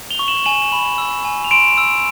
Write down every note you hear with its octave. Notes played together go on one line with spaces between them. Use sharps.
F7 G7
C#6
E7 F#7
G#5 E7 F#7
B5
E6
G#5
F7
C6 D7 E7
E6